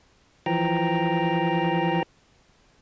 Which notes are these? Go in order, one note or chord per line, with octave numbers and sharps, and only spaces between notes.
E3 F3 G5 A#5